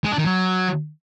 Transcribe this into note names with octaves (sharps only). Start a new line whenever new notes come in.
G#3
D4
D#3
F#3